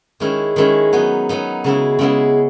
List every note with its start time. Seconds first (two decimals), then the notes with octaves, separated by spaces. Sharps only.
0.20 D#3 G#3 C#4 E4
0.56 D#3 G#3 C#4 E4
0.93 F#3 B3 D#4
1.29 F#3 B3 D#4
1.64 C#3 G#3 B3 E4
1.99 C#3 G#3 B3 E4